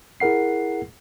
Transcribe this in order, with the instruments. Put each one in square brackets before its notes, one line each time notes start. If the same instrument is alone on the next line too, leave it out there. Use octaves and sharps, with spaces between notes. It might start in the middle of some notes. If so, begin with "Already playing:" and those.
[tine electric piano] E4 G#4 A#4 F#5 C7